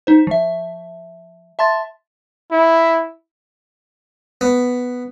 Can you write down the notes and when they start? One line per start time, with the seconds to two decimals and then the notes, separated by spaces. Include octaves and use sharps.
0.07 D#4 C5
0.27 F3 E5
1.59 E5 A5 C6 A6
2.52 E4
4.41 B3